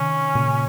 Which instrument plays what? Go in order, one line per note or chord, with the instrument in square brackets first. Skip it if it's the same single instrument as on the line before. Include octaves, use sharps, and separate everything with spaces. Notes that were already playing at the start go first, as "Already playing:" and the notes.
Already playing: [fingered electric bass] C3 D#3 [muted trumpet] C#4
[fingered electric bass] A#2 C#3